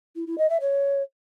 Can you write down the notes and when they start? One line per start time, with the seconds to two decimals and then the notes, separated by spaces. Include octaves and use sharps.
0.15 E4
0.26 E4
0.38 D#5
0.49 E5
0.60 C#5